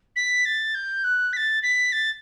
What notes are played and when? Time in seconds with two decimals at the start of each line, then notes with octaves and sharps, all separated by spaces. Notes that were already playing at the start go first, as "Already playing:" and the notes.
0.16 B6
0.45 A6
0.74 G6
1.04 F#6
1.33 B6
1.36 A6
1.63 B6
1.92 A6